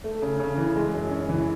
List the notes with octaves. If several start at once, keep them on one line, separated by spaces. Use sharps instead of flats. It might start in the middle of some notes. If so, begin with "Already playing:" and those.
A3
C#3
C#3
E3
G#3
F#2
C#4
E3